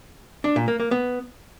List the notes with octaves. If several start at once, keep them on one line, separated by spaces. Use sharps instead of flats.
D4
A#2
A#3
A#3
B3